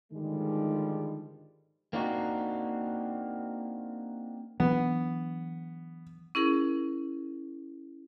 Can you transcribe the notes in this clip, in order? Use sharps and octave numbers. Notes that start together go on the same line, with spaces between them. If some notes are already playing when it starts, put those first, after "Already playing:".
G#2 D3 D#3 F3 G3 G#3
A#3 C4 D4 D#4 F#4
E3 F#3 B3 D4
C#4 E4 G#4 A#4